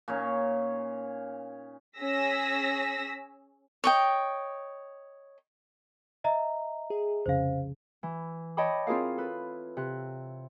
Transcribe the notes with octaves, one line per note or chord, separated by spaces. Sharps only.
A#2 C#4 D#4 C#5
C#4 G#4 E6 A#6 B6
C#5 D#5 G5
D#5 E5 A#5
G#4
C2 F2 C#3 C5 F5
E3
C#5 D#5 G5 A5 B5 D6
C4 E4 F4 G#4 A#4 F5
A4 B4
C3 F#6